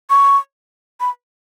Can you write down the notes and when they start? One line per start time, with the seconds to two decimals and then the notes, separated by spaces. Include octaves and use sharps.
0.10 C#6
1.00 B5